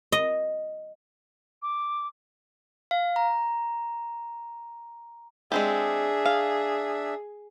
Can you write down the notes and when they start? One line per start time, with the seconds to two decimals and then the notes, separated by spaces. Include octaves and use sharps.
0.12 D#5
1.62 D6
2.91 F5
3.16 A#5
5.52 G#3 C4 D4 G4 G#4 E5
6.25 F5